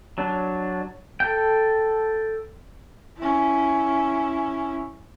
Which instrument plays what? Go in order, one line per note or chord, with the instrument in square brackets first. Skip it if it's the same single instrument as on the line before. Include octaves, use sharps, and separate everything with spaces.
[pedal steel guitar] F#3 D4
A4 G5
[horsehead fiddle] C#4 E4